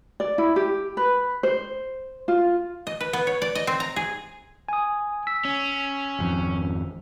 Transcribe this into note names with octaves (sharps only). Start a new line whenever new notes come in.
D5
E4
G4
B4
C5
F4
D#5
B4
B3
C#5
D5
D#5
C4
A#5
G#4
G#5 D#6
E6 B6
C#4
G#1 F2